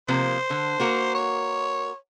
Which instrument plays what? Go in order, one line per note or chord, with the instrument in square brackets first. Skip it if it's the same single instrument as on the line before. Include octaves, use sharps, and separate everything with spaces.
[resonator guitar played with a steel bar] C3 F3 A#3 [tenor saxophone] C5
[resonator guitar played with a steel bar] D3
A#3 F#4 A#4
[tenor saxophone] C#5